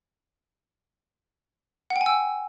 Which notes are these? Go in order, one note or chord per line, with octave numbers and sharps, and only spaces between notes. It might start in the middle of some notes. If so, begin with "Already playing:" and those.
F#5
G5
G#5
E6